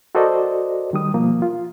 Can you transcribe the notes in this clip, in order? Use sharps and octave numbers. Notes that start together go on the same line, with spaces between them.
F#4 A4 A#4 C5 D5 D#5
D#3 G3 D#6
B2 F3 A#3
F4